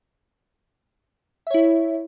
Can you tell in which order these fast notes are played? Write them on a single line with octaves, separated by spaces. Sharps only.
E5 C#5 E4